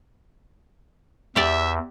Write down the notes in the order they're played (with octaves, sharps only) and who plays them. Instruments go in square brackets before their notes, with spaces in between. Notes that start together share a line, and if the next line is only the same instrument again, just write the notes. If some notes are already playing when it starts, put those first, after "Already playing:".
[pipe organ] E2 [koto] G4 D5 [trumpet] E5